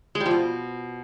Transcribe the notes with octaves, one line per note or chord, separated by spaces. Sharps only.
G#3
G3
F3
B2